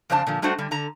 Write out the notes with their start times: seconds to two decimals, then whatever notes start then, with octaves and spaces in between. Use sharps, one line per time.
0.10 F2 C#3 D4 C5 G#5 A5
0.27 A#2 D3 F3
0.42 G3 A3 D4 F#4 C5 F#5
0.58 D3 G3
0.71 D3 A#5